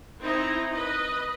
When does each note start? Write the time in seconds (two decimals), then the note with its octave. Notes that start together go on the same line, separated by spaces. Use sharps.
0.20 C4 D#4 E4 A#5
0.71 B4 D#5